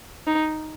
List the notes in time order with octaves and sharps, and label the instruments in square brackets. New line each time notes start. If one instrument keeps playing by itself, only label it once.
[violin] D#4